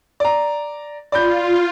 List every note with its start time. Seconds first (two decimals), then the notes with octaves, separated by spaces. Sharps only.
0.20 D5 A#5
1.12 F4 D5 B5 G6